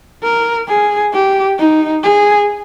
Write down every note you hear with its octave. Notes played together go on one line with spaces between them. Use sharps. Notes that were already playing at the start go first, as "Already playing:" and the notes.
A#4
G#4
G4
D#4
G#4